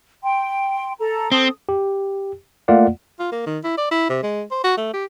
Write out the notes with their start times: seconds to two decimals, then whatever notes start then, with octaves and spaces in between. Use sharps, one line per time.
0.24 G5 C6
0.99 A4 A#5
1.32 C4 A4 D#6
1.69 G4
2.68 A3 A#3 F4 D5 F5 F#5
3.19 F4
3.32 A#3
3.46 D#3
3.64 E4
3.78 D5
3.91 E4
4.10 C3
4.23 G#3
4.51 C5
4.64 F#4
4.77 A3
4.94 G4